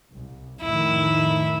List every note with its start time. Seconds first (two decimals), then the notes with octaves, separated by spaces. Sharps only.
0.13 C2
0.62 F2 A2 D#3 E4